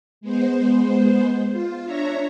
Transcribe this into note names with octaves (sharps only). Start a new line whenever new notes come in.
G#3 B3 C5
F4
D4 C#5 E5 A#5